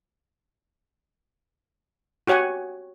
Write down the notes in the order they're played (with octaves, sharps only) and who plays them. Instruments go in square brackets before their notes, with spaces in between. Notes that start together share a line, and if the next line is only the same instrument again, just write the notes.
[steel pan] F#4 G4 C#5 F#5 G#5